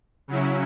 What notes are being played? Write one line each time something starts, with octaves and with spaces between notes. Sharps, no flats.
C#3 F#3 C#4 E4